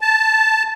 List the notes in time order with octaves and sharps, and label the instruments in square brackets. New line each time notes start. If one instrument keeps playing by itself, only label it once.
[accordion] A5